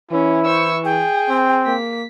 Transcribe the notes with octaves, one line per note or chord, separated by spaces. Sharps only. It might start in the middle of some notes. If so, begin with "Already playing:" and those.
E3 C#4 E4
C5 C#6 E6
G#4 G5
C4
A#3 B6